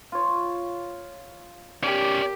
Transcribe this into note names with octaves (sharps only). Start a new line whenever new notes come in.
F4 C#5
C#4 G4 A#4 D5